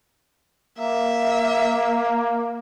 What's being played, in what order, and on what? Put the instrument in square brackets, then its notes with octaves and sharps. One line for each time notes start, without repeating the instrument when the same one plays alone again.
[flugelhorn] A#3 [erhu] E5